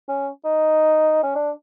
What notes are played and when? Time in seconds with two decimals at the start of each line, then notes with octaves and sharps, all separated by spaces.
0.08 C#4
0.44 D#4
1.23 C#4
1.35 D4